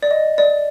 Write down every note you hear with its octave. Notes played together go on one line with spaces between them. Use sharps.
D5
D#5
D5